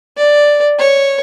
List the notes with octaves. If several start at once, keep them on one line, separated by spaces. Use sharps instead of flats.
D5
C#5